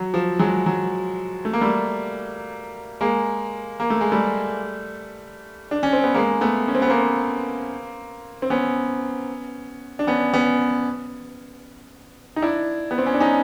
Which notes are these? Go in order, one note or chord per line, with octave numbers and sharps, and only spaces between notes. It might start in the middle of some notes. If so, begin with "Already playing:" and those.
Already playing: F#3
F3
F#3 G#3
F#3
A3
A#3
G3 A3
G#3 A#3
A#3
A3
G#3
G3 A3
D4
C#4
C4
B3
G#3 A#3
A3 B3
C#4
C4
B3
A#3 C4
C4
B3 C#4
D4
B3 C#4
B3 C#4
D#4
D4 E4
B3
C4
C#4
D4
C#4 D#4